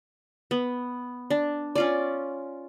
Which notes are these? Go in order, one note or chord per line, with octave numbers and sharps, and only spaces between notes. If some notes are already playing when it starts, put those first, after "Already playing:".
B3
D4
C#4 F4 D5